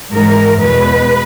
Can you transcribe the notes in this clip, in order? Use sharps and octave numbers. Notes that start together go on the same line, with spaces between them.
G#2 E3 G#3 A#4
E2 B2 G#3 B4